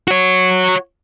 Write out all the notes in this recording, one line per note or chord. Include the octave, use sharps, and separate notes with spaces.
F#4 C#5